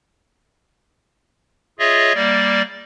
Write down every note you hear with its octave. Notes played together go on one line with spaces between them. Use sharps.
F4 G#4 C#5 D#5 E5
G3 A#3 D5